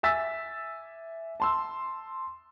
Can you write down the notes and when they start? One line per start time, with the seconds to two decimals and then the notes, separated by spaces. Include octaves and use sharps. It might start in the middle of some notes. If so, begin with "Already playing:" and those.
0.03 E5 G#5 E6 A6 B6
1.40 A5 C6 E6